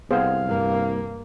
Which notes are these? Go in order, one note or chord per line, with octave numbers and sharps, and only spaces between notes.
C2 B3 G#4 C5 F5
G2 A#3